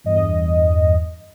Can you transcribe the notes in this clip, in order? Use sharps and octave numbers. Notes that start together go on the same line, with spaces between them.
E2 G2 D#5